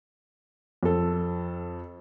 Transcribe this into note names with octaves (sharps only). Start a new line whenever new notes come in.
F2 A4